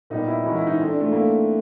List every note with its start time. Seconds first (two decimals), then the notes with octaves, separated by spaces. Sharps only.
0.10 A#2 G3 B3 D#4
0.27 E4
0.44 E3 G#3 C#4 E4 F#4 A#4
0.56 E4
0.67 D#4
0.78 C4 E4 A4
0.89 D4
1.01 A3
1.11 A#3 C4 E4 A4